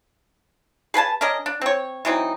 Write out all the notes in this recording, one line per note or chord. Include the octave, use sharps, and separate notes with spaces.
G#4 B4 G#5 A5
C#4 D4 A#4 D#5
D4
C4 C#5
E3 F#3 C4 D#4